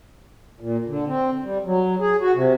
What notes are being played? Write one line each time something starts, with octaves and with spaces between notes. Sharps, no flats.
A#2
D3
C4
G3
F#3
G#4
F#4
C3